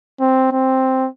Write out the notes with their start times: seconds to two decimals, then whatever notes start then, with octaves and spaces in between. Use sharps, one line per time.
0.20 C4
0.52 C4